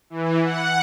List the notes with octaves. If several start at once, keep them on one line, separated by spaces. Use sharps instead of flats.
E3
F#5